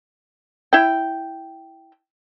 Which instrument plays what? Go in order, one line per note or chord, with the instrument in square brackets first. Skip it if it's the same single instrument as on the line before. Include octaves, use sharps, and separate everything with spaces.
[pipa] E4 G5